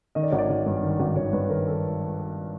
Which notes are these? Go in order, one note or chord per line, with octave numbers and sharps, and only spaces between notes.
D#3 D#5
D5
G#1 C#5
D5
G#1
G2
D#3
G#1
G#1 C#5
G2 B4
D#3 A#4
A4